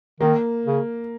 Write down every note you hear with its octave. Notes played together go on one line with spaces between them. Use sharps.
D#3 A#3
C#3